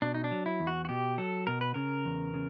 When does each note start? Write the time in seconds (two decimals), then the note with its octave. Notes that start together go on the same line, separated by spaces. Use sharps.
0.02 B2 D4
0.14 D#4
0.24 D4
0.31 F#3
0.46 E4
0.60 E2
0.67 F#4
0.85 F#4
0.89 B2 G4
1.18 F#3 A4
1.47 B2 A#4
1.61 B4
1.74 C#3 A#4
2.05 E2
2.34 C#3